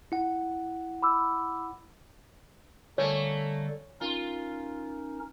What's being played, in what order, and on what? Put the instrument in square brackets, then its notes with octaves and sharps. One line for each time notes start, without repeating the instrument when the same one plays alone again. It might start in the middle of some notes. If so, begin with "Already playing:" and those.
[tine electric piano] E4 F#5
[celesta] B5 D6 E6
[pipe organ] D3 G3 [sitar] A3 A#3 [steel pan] C#5
[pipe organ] C#4 D#4 A#4 [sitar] F4